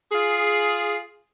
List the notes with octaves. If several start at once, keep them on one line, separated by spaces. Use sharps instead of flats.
F4 G#4